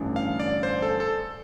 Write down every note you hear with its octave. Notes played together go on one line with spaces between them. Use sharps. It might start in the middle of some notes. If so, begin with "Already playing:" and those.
Already playing: A1 G2 D3
F5
D5
C5
A4
A4